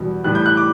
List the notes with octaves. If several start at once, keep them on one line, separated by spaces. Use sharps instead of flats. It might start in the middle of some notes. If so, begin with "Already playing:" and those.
Already playing: E2 B2 G3
A2 E3 G3 F#6
G6
F#6
D6